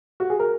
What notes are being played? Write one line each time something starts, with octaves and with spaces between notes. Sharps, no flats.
F#4
G#4
A#4